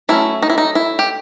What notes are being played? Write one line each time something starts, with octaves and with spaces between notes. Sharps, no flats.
F#3 A3 C#4 E4
D#4
E4
D#4
E4
G4